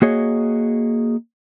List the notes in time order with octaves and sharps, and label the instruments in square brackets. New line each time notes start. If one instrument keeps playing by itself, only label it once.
[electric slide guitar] A#3 F#4 G#4 C#5 D#5